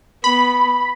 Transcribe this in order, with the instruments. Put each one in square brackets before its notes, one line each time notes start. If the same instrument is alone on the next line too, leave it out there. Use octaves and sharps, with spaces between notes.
[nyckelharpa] B3 [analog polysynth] B5